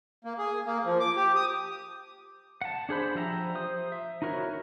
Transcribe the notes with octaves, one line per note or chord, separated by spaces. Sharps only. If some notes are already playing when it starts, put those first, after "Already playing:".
A#3
G#4
A#3
F3
D6
G4
D#6
F#5 A5
D4 G#4 C5 B5
F3 G4 E5 A#5
C5 D#6
E5
D#4 E4 F#4 A#4 C#5